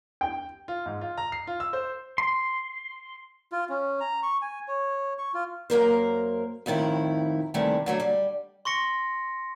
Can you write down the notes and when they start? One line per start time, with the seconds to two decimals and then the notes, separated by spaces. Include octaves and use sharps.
0.21 G5
0.68 F4
0.86 G#2
1.01 F4
1.18 A#5
1.32 C7
1.47 F4
1.60 E6
1.73 C5
2.18 C6
3.52 F4
3.69 C#4
4.00 A#5
4.23 C#6
4.42 G#5
4.68 C#5
5.19 C#6
5.34 F4
5.70 F#2 A#3 A#4 C5
6.66 F2 A2 D#3 E4
7.54 C3 D#3 E3 G3 A3
7.86 D3 F#3 A3
8.00 G3
8.65 C6 C#6 A#6 C#7